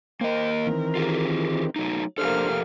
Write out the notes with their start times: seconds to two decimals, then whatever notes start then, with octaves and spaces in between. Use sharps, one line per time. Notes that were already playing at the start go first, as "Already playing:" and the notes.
0.21 A#3 A#4 C5 D#5 G5
0.66 D#3 E3 C4
0.95 F4 G4 G#4
1.76 F#3 A3 D#4
2.18 F2 A#3 D4 G4 A4 C5 F6